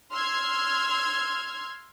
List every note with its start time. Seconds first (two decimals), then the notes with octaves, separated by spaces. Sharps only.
0.12 C6 E6 F6 G#6